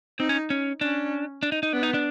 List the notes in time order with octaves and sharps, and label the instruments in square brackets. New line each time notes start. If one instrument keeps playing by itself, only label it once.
[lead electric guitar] C4 [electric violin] D#4
[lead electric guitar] C#4
C#4
[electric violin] C#4 [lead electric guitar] D4
[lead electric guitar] D4
D#4
D#4
[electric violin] B3 [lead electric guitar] D4
[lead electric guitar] D#4
D4